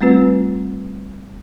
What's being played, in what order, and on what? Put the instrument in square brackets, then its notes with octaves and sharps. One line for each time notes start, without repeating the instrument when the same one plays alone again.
[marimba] G3 A3 C4 F4 B4